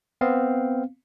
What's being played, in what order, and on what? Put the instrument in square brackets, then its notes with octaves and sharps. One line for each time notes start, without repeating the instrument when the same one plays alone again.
[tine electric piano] B3 C4 F5